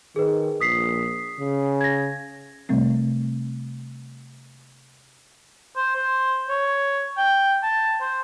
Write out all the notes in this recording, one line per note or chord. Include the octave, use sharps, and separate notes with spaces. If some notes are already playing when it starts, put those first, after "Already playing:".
D#3 G#4 B4
A#1 D#6 B6 C7
C#3
G#6 A#6
C3 G3 A3 C4
C5
C5
C#5
G5
A5
C5